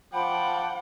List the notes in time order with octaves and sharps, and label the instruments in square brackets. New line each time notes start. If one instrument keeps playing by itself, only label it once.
[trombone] F3 [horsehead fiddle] F#5 [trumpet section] G5 A5 D6 [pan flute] B5